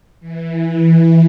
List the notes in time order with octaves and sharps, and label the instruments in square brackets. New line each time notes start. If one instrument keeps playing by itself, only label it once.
[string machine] E3